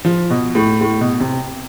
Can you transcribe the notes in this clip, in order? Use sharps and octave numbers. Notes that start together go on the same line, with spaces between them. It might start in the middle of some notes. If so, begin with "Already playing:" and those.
F3
B2
A2
A2
B2
C3